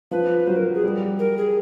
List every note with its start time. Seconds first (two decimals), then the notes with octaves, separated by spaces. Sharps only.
0.11 F3 B4
0.47 F#3 C5
0.56 A#4
0.74 G#4
0.83 G3
1.19 A#4
1.37 G#4